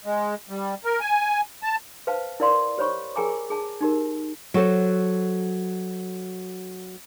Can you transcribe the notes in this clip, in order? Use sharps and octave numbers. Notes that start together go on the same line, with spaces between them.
G#3
G3
A#4
G#5
A5
B4 C5 F5 A5
E4 A#4 D5 F5 C6
G4 C5 C#5 B5 C#6
G#4 A#4 G5 G#5 A#5 D6
G#4 A5
D#4 G4 A#4
F#3 F#4 A4 C5